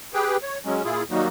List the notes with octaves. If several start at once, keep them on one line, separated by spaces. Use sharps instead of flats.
G4 G#4 B4 G5
C#5
F#3 G#3 C#4
A#2 E4 F4 G#4
D#3 F#3 G3 A#3 D#4 F#4